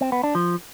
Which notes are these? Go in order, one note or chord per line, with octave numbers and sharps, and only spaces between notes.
C4
B3
D4
F3